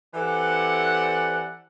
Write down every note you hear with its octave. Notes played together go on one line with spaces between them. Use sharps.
E3 C4 G4 A4 D5 F#5